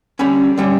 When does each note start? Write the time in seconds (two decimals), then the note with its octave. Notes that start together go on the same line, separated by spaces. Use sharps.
0.19 D3 G3 C#4 B5
0.58 D3 G3 C#4